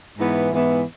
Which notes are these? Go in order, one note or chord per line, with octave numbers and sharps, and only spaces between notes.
G#2 E3 B3 E4
G#2 E3 B3 E4